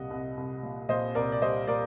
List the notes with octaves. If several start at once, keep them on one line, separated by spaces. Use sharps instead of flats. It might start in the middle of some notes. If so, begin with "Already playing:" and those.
Already playing: C2 A#2 G3 D#5 F#5
C2
C2
A#2
A#2 C5 D#5
C2 A#4 D5
D5
G3 C5 D#5
A#2 A#4 D5